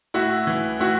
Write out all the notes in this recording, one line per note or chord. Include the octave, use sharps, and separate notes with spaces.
A2 E4 F#4
E3
A2 E4 F#4